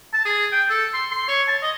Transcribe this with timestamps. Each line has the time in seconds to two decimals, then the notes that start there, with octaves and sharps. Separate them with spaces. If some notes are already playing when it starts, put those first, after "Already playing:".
0.13 A5
0.25 G#4
0.52 G5
0.69 A4
0.94 C6
1.11 C6
1.28 C#5
1.48 A5
1.62 D#5